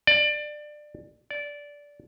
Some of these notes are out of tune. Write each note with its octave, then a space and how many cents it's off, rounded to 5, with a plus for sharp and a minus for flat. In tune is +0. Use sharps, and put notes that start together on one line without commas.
D5 +20
D5 -15